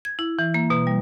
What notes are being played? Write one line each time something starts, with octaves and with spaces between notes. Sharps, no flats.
G#6
E4
E3
A#3
B2
G3